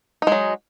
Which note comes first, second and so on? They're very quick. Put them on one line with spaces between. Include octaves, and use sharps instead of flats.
D#4 G#3 F#3